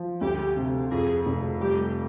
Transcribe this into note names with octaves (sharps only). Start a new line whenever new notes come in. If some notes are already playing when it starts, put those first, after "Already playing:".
Already playing: F3
D2 G4
C3
F2 G#4
F1
G3 G4